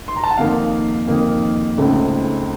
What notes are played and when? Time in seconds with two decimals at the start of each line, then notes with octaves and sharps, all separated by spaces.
0.08 C6
0.16 A#5
0.23 A5
0.31 F#5
0.38 F2 D#3 A#3 D#4 F5
1.07 F2 D#3 A#3 D#4
1.78 C#2 C#3 A3 C4 D#4